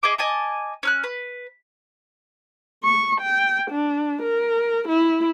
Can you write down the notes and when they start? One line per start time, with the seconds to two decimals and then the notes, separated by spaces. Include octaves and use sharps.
0.03 G#4 D#5 E5 D6
0.18 D#5 G#5 A5 D6
0.83 C#4 F6 F#6
1.04 B4
2.84 C#6
3.21 G5
3.71 D4
4.22 A#4
4.88 E4